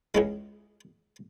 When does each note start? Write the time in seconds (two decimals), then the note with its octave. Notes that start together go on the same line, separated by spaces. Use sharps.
0.15 C#2 C#3 G#3 E4